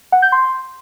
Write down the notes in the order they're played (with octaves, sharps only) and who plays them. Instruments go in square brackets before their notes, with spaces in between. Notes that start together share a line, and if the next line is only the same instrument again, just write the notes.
[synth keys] F#5
G6
C6